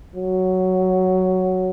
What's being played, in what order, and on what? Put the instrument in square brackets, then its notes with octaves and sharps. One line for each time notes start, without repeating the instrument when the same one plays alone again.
[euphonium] F#3